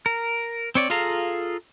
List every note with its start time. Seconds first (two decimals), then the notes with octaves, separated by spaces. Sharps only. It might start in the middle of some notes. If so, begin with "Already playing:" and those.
0.06 A#4
0.75 C4 C#5 D5
0.90 F4 G#4 A4 F5 A#5